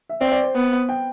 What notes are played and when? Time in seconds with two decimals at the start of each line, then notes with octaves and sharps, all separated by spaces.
0.09 E5
0.21 C4 D5
0.32 D5
0.43 C5
0.55 B3
0.89 G5